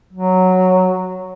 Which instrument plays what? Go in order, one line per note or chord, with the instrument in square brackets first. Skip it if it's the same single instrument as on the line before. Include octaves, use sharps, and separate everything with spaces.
[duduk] F#3